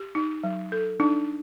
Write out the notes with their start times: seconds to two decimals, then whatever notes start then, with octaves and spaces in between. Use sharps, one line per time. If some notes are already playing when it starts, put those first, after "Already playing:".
Already playing: G4
0.15 D#4
0.44 F#3
0.72 A4
1.00 D4 D#4